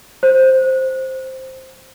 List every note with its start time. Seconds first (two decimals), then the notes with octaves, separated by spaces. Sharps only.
0.23 F#4 C5